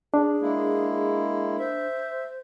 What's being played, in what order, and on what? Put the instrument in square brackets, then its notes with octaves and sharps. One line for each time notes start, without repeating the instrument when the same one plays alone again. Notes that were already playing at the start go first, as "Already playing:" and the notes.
[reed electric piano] D4 [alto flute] G#4
[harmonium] G#3 A#3 E4
[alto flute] C5 [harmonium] E5